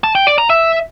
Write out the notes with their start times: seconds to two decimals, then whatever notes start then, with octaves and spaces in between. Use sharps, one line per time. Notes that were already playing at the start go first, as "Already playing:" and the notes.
0.04 A5
0.15 G5
0.27 D5
0.38 A#5
0.50 E5